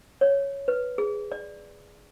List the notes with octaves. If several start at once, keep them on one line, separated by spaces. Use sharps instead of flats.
C#5
B4
G#4
D5